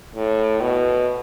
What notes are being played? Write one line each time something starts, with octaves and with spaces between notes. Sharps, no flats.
A2
B2